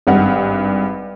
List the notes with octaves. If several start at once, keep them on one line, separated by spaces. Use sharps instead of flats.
G#1 G2 F#5